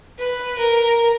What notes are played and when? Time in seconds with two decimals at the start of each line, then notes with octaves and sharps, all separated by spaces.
0.19 B4
0.58 A#4